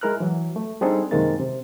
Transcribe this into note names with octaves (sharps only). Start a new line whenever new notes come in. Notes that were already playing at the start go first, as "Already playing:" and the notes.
G#3 E4 A#4 F6 F#6
E3 F#3
A3
G3 C4 D4 D#4 G#4 A4
F#2 C3 D#3 G#3 A#3 A6
C3